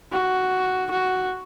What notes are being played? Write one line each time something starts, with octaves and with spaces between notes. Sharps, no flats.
F#4
F#4